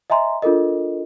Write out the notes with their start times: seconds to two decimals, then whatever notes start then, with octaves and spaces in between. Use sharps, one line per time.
0.10 D#5 E5 G#5 A#5 C6
0.42 D4 F4 A4 A#4 D#5